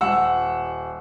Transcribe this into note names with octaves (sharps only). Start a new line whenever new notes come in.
D#1 F#5 E6